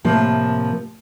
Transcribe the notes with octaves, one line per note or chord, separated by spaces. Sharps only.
A2 C3 F3 A#3